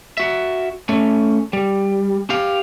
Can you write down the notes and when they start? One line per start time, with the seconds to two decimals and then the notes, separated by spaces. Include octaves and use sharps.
0.17 F#4 E5
0.89 A3 C#4
1.53 G3
2.30 G4 F5